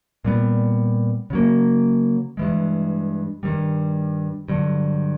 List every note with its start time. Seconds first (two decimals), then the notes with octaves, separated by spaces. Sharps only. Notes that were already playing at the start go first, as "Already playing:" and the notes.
0.25 A#2 G3 B3
1.30 C#3 F#3 A#3
2.37 G2 E3 G#3
3.43 G2 D#3 G3
4.49 G2 D3 F#3